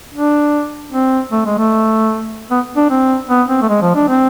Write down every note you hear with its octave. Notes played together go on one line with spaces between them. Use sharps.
D4
C4
A3
G#3
A3
B3
D4
C4
B3
C4
A3
G#3
F3
D4
C4